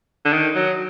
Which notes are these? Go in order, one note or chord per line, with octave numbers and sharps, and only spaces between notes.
D3
D#3
F#3